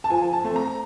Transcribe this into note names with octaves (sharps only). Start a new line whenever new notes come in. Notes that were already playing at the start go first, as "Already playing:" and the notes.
A5
F3 G#5
A5
A3 C4
A#5